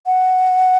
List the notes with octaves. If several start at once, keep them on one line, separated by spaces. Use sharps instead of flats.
F#5